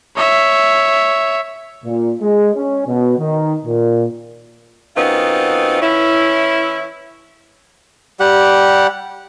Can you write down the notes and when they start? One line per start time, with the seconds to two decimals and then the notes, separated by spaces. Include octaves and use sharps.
0.17 C#5 E5
1.84 A#2
2.21 G#3
2.55 C#4
2.87 B2
3.18 D#3
3.65 A#2
4.96 F#2 B3 C4 D#4 F4
5.82 E3 C#4 E4
8.20 G3 G4 F#5